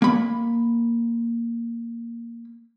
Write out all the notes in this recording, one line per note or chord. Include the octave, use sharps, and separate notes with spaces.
A#3 B5